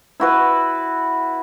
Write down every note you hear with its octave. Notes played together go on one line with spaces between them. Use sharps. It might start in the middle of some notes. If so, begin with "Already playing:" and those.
E4 F#4 B4